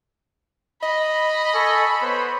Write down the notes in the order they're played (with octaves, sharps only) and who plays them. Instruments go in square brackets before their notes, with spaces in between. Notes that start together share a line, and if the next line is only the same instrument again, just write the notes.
[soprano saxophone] D#5 [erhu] B5
[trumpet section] A4 G#5 C#6
B3 C5 C#5